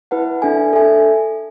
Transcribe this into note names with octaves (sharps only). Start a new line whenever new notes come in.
E4 B4 F#5 A5
D4 A4 E5 G#5
D4 A4 E5 G#5